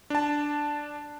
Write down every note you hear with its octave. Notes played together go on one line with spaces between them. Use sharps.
D4 A5